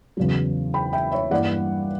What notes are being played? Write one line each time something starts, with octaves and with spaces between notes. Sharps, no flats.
E2 C#3 F#3
G5 B5
E5 G5
C#5 E5
G2 E3 G3 A#3 D5 F#5